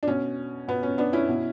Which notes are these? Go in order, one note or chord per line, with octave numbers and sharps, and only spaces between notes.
D4
B2 C#4
B2 B3
C#4
B3 D4
C#4 E4
B2